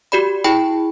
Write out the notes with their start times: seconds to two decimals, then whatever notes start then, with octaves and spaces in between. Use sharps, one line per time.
0.12 F#4 G4 D5 B5
0.44 E4 G#4 G5 A5 B5